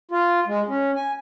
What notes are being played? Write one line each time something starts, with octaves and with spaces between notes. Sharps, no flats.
F4
G#3
C#4
G#5